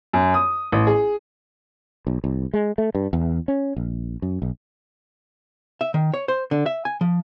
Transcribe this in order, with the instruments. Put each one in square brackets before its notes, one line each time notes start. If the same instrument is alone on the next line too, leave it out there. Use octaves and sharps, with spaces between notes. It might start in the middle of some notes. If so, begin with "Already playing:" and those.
[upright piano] F#2
D#6
A1
G#4
[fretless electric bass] B1
C2
G#3
A3
G2
E2
C#4
A#1
F#2
B1
[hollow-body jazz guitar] E5
D#3
C#5
C5
D3
E5
G#5
F3